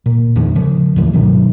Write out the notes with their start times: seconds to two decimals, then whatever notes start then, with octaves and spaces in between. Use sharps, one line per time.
0.06 A#2
0.36 E2 D#3 F3
0.55 C#3 F3
0.96 D2 G#2 E3
1.13 G2 B2 D#3 F#3